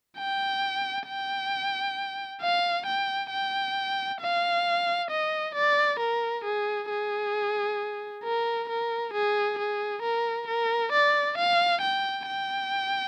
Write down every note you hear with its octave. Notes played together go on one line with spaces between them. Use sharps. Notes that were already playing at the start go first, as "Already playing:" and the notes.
G5
G5
F5
G5
G5
F5
D#5
D5
A#4
G#4
G#4
A#4
A#4
G#4
G#4
A#4
A#4
D5
F5
G5
G5